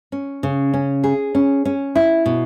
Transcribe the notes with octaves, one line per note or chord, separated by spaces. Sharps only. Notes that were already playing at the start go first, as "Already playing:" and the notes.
C#4
C#3
C#4
G#4
C#4
C#4
E4
B2